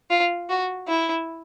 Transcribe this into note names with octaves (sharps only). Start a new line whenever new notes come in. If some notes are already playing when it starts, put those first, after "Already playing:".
F4
F#4
E4